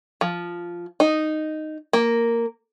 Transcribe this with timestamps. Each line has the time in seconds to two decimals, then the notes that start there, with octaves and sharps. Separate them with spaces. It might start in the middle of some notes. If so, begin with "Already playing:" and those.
0.21 F3
1.00 D#4
1.93 A#3